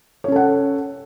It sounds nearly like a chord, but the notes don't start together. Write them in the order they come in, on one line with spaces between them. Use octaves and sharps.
C#5 C#4 A4 F#5